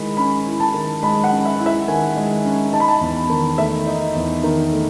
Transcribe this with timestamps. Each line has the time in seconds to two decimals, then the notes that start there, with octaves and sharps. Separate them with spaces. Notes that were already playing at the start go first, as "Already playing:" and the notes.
Already playing: D#3 G#3 E4 B5
0.17 C#4 B5
0.46 E4
0.60 A5
0.74 D#3
1.03 G#3 B5
1.24 F#5
1.31 C#4
1.45 E5
1.59 E4
1.66 E5
1.88 D#3 G#5
2.16 G#3
2.44 C#4
2.73 D#4 A5
2.80 B5
2.88 A5
3.01 E2
3.30 D#3
3.58 A3 E5
3.87 D#4
4.15 E2
4.44 D#3
4.72 A3